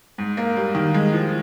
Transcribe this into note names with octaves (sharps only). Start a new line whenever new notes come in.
G#2
A#3
G3
D#3
G#3
F3